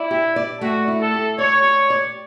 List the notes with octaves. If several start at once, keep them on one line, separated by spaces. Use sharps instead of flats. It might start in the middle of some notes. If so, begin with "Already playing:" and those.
Already playing: E4 D5
G4
D5
A3 F#4
E4
A4
G4
C#5 D5
G4
D5